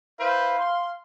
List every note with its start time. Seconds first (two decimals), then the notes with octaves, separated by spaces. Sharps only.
0.20 E4 B4 C5 F5
0.59 C6